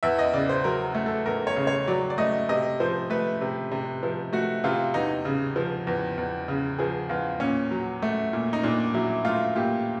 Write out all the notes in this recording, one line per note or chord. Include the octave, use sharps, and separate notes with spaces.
E2 E5
D#5
C#3 D5
C5
F#3 A#4
A3
A4
E2 A#4
C#5
C#3
C#5
F#3 D5
D5
A3 D#5
C3 D#5
F3 C5
A3 B4
C3
C3
F3
A3 F#4
C3 F4
E2 D#4
C#3
F3
E2
E2
C#3
F3 G#4
E2 F4
A#2 C#4
F#3
A3
A#2
D#4
A#2 D4
F#3 E4
A3 F4
A#2 G4